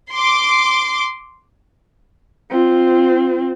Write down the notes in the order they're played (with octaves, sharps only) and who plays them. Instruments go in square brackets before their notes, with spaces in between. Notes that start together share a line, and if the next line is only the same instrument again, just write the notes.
[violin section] C6 D6
[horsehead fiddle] C4 F4